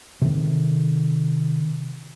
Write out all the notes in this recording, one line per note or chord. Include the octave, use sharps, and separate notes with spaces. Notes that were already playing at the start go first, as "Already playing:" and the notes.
C3 D#3